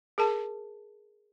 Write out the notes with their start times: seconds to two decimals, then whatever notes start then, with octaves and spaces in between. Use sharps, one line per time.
0.18 G#4 A#4 A5